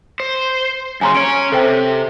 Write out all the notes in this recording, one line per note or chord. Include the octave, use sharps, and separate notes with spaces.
C5
F#2 C#3 C#4 G#5 A#5 C6
C#4 C#5 D7
C3 A4 C5 G5